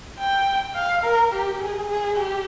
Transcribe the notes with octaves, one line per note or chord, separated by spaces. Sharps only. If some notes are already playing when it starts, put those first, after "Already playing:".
G5
F5
A#4
G4
G#4
G#4
G4